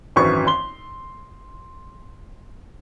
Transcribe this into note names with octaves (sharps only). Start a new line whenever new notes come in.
G#1 F#2 E3 C#6
C6 G7